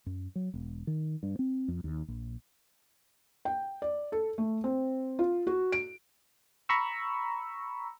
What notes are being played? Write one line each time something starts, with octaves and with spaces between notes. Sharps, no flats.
F#2
F#3
E1
D#3
G2
C4
F2
D#2
A#1
G5
D5
A4
A3
C4
F4
F#4
D7
A#5 B5 C#6 E6